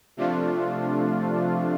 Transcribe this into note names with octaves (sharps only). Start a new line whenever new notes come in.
C3 F3 A3 D4 F4